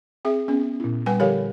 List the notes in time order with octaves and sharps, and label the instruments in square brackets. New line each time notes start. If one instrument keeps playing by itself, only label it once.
[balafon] C4 G#4 E5
[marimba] B3 [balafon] C#4
[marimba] A#2 E4
[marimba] G3 [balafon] B4 F#5 G#5
[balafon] D3 F3 A#4 [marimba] G4 C#5 F5